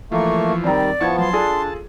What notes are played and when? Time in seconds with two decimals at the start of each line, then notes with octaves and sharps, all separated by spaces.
0.12 E3 F3 A3 A#3 C#6
0.64 D#3 G3 C4 D5 A#5
1.01 F3 B3 E4 A5 C#6 G#6
1.18 F#3 A5 C6
1.33 D4 F4 G#4 A4